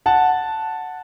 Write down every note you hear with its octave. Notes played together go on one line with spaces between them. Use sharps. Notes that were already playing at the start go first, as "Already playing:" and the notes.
F#5 A5